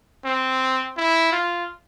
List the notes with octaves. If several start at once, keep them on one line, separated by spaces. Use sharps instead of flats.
C4
E4
F4